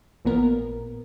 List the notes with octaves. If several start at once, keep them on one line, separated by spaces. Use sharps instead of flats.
A1 A#2 B3 A#4